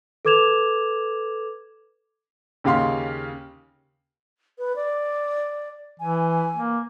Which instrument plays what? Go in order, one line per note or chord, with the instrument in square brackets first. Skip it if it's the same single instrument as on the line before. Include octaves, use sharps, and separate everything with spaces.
[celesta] A4 B4 D6 G#6 E7 F7
[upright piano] D#2 C#3 G4 F5 C6
[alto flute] B4
D5
[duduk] E3 [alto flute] G#5
[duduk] A#3